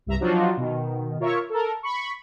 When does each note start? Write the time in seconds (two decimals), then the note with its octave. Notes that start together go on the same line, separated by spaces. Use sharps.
0.06 C2 G2 E5 A#5
0.20 F3 F#3 D4 D#4 F4 F#4
0.57 B2 D#3
1.20 F4 A#4 C#5 E5 C#6
1.50 A4 A#4
1.83 B5 C#6